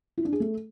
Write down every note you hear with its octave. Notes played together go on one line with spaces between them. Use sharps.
E4
D4
G#4
A3